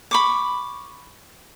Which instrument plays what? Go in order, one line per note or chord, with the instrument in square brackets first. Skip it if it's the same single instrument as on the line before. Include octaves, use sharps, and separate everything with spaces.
[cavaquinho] B5 C#6 D6